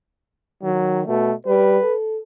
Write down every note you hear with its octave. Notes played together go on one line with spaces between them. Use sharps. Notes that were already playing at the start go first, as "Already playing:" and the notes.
D#3 F#3
B2 A3
G3 B4
A4